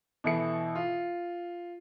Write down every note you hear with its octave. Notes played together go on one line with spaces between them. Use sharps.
B2 E3 E4 A4 C#7
F4